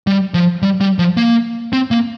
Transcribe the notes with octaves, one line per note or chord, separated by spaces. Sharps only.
G3
F3
G3
G3
F3
A#3
C4
A#3